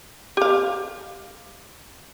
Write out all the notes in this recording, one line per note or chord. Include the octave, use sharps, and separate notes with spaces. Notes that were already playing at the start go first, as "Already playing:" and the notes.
G4 F5